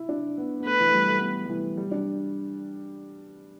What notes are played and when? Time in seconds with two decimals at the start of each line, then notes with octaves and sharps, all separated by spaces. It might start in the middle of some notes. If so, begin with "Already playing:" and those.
Already playing: E4
0.09 D4
0.37 B3
0.60 B3
0.65 A3 B4
0.80 E3
0.88 A3
0.94 G3
1.08 A3
1.17 B3
1.22 A3
1.46 G3
1.49 E3
1.77 G3
1.91 D4